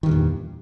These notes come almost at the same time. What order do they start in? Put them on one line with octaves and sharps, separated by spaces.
D#3 G2 A#2 E2